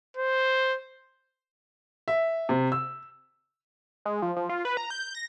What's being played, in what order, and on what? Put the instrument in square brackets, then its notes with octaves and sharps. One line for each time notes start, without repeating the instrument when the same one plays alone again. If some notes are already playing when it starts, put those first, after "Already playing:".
[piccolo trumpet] C5
[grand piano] E5
C3
E6
[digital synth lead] G#3
F3
F3
F4
B4
A#5
G6
A#6